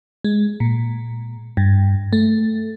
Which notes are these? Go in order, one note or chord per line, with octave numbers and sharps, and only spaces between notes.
G#3
A#2
G2
A3